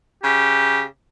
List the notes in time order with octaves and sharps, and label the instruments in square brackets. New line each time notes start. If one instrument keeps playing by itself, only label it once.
[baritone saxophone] C#3 [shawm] G4